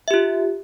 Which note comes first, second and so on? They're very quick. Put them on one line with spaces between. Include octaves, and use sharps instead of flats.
E5 G4 F4